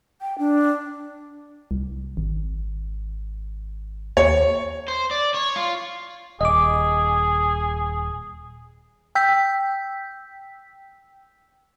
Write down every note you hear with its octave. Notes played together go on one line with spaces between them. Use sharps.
G5
D4
C2
G#1
D#2 C#5
C5
D5
C#5
F4
D#1 G#4 D#5 D6
G5 E6 G6 B6